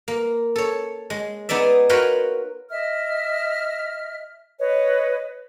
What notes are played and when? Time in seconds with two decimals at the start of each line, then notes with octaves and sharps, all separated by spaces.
0.08 A#3
0.56 A4 C#5
1.10 G#3
1.49 B3 D#4 G#4 D5 E5
1.89 F4 F#4 A#4 B4 C#5 G5
2.70 D#5 E5 F6
4.59 B4 C#5 D#5